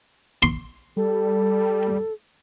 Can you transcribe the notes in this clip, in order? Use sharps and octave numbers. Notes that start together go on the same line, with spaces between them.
C6
G3 A4